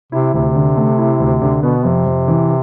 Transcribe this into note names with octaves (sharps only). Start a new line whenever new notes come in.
C3 E4
D2 C3
D3
A3
E4
D2
D3
B2 B3
F2 C3
F2
E3